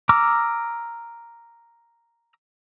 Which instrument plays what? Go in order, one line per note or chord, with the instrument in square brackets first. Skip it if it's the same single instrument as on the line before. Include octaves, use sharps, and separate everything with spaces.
[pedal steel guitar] A#5 D6 E6 F6